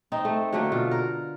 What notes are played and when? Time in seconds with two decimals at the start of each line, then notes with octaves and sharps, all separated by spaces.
0.12 C4 D#4
0.25 A3
0.52 D3 F#3 A3 A#3
0.72 B2 F4
0.91 A#4